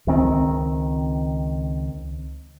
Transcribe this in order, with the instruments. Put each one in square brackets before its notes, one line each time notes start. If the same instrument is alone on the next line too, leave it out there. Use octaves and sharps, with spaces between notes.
[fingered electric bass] C#2 D#3 C4